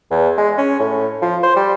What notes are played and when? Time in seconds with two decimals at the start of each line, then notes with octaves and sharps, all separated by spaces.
0.11 E2
0.37 G#3
0.58 C#4
0.80 A2
1.22 F3
1.43 C5
1.56 G3